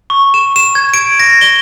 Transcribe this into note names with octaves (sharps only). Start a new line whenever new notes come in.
C#6
E7
E7
G#6
D7
A#6
G7